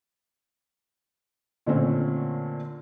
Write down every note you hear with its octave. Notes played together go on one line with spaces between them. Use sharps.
A#2 D3 A3 C4 C#4